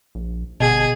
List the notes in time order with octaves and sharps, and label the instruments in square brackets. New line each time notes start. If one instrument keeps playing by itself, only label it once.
[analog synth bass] A#1
[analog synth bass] G1 [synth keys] B2 [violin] G#4